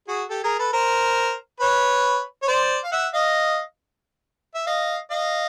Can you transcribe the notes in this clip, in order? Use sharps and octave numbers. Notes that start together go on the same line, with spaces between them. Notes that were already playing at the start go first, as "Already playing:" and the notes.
F#4 G#4
G4 A4
G#4 A#4
A4 B4
A#4 C5
B4 C#5
C#5
C5 D5
F5
E5 F#5
D#5 F5
E5
D#5 F5
D#5 F5